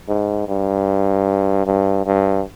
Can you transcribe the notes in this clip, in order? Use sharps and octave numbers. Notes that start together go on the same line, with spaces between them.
G#2
G2
G2
G2